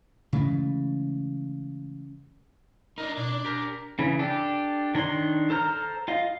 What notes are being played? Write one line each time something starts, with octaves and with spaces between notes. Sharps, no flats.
C#3 E3 G#3 A3
D4 D#4 A#4
B2 D4 D5
D4
G4 A#4
C#3 E3
D4 G4 A4
D#3 D4 C#5 C6
A4 C5 A#5 F6
F4 D#5 F5